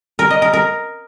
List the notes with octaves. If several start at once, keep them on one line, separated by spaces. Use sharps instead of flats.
A#4
D#5
A#4
A#4